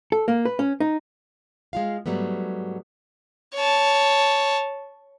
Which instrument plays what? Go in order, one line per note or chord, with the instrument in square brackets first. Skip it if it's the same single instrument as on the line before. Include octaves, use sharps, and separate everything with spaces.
[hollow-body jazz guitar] A4
A#3
B4
C#4
D#4
[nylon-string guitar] G#3 F4 F5
G#2 F#3 G3 A3 B3
[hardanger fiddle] C#5 A5